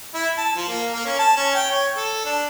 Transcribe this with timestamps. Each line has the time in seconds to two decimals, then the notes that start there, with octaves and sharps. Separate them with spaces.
0.14 E4
0.38 A5
0.56 F3
0.68 A#3
0.93 A#3
1.06 C#4
1.19 A5
1.36 C#4
1.55 G5
1.71 C#5
1.96 A4
2.25 D4